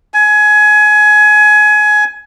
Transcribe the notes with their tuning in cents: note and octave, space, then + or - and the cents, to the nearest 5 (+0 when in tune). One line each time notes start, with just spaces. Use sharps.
G#5 +25